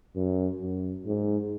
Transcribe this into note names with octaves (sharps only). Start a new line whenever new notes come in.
F#2
F#2
G#2